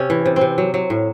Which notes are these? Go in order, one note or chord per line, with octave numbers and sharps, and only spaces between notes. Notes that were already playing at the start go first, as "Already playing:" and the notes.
Already playing: C3 C#4
E3
C3
C4
C3
F#3
F#3
A2